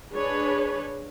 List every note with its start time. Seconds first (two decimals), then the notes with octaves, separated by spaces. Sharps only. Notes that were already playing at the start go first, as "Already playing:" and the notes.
0.13 D4 G#4 B4 C#5